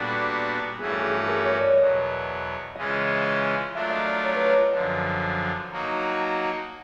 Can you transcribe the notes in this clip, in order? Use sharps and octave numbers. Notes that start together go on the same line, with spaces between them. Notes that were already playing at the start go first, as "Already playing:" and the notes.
Already playing: A#2 G3 B3 D4 F#4 A4
G2 E3 A3 C#4 F#4 G#4
A4
G#4
A4
A#4
C#5
D5
E2 B2 F#3 D#5
C#3 E3 G#3 C#4 F4 D#5
F#3 A3 D4 F4 A#4 E5
D#5
D5
C#5
B4
D#5
F#2 D3 F3 A5
F#3 A#3 D#4 F#4 A#5
A5
A5
A5
A5